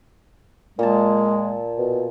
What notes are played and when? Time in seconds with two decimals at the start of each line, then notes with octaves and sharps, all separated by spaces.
0.79 A#2 G#3 A#3 A5
1.78 B2